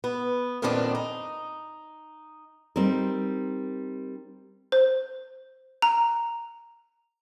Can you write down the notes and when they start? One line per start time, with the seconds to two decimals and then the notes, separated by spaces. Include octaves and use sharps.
0.04 B3
0.62 F2 A#2 D#3 B3 C4 D4
0.95 D#4
2.76 G3 C4 D#4 A#4
4.72 C5
5.82 A#5